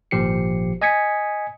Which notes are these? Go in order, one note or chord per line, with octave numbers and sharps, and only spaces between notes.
G#1 A#2 F3 G4 C7 C#7
D#5 G#5 D#6 G#6 B6 C#7